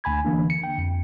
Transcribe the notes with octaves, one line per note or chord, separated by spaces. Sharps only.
D2 G#5 B5 G#6
D3 E3 A#3 D4
C#7
G5
F2